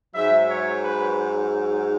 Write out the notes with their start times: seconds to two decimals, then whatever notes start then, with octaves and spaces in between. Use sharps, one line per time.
0.14 G#2 F#3 E5
0.47 C#5
0.81 B4